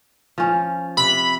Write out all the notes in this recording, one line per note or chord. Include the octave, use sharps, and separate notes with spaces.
F3 C#4
C3 B5